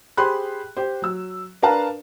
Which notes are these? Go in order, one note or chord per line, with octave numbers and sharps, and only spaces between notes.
G4 G#4 C5 B5 C6 F#6
G4 C5
F#3 E6
D4 A#4 B4 F5 A5 A#5